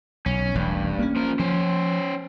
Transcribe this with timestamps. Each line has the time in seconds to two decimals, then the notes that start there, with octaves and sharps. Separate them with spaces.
0.26 B1 C#4
0.55 E1 A1 G2
0.99 A#3 C#4
1.16 F3 A#4
1.39 F3 C#4 C5